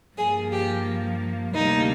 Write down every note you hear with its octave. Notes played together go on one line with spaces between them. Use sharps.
G2 F3 A#3 G#4
G4
D2 C3 G3 A#3 D#4